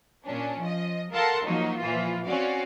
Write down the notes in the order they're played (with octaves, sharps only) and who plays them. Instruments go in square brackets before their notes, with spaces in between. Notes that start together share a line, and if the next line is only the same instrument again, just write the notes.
[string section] A#2 C#4 D4
F3 D#5
A4 A#4 F5 F#5 A5 C6
F3 F#3 A#3 D#4
A#2 E3 F3 F4
C4 C#4 F#4 C#5 D5 F5